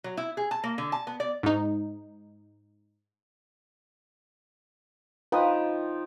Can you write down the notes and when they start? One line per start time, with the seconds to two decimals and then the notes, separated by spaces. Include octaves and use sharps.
0.04 F#3
0.17 E4
0.37 G#4
0.51 A5
0.64 A#3
0.78 D3
0.92 A5
1.07 B3
1.20 D5
1.43 G#2 D#4
5.32 F3 D#4 B4 G5 D#6